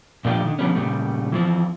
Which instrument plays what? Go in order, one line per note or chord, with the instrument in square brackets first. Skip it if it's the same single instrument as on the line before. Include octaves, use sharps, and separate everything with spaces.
[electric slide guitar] A#2 F3 A3 D4 F4 G4
D3 D#3
D3 F3 G3 B3 C#4
A#2 C#3 G3 A3
E3 F3 C4